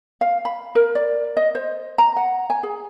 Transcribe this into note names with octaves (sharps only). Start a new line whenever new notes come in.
F5
B5
A#4
D5
D#5
C5
A#5
F#5
G#5
G#4